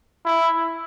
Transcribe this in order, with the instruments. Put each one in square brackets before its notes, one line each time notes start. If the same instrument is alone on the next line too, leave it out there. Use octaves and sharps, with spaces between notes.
[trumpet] E4